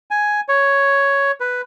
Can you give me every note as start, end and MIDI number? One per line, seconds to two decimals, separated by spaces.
0.11 0.41 80
0.49 1.32 73
1.40 1.61 71